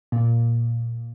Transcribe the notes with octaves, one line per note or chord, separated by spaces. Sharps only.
A#2